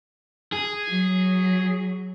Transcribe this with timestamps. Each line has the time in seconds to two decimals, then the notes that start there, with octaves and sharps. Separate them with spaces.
0.52 G#4
0.89 F#3